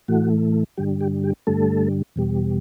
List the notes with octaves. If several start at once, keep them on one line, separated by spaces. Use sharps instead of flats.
A2 E3 A3 F#4
G2 D3 G3 G4
G4
G4
G2 D3 G3 A3 A4
E2 B2 G3